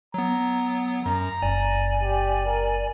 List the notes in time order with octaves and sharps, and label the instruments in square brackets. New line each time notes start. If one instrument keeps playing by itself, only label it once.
[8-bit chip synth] F#3 B3 [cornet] A#5
[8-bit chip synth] F#2 [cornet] A#5
[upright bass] F#1 [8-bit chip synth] D5 G#5
[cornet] G4
A#4